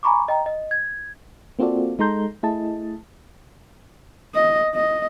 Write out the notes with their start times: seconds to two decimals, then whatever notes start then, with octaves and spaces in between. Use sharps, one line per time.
0.03 G#5 A#5 B5 C#6 D6
0.28 D#5 G5 A#5
0.46 D#5
0.71 G#6
1.59 A#3 C4 F4 F#4 A4 D5
1.99 G#3 D#4 A4 A#5 C6 G6
2.43 A3 E4 G#4 D#5 A5
4.35 D#5
4.75 D#5